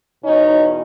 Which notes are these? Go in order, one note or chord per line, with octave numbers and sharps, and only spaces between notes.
E2 B2 C#4 D#4